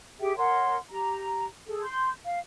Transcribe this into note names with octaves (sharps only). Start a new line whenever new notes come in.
G4 G#4 E5 G5
A#4 C#5 F#5 C6
G4 A#5
G#4 A4
C6 G6
F5